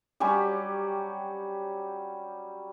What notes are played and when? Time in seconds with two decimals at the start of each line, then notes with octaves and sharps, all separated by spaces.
0.20 F#3 G3 C#4 G4